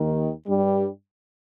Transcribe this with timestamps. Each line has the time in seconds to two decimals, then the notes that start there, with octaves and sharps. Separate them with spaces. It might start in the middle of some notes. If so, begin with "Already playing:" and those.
Already playing: D#2 D#3
0.47 G2 G3